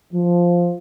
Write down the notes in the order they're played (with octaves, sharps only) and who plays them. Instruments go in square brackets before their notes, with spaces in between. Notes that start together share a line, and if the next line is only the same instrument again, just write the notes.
[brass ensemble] F3